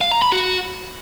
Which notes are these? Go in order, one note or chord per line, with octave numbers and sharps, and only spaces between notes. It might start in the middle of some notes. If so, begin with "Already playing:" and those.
F5
A#5
B5
F#4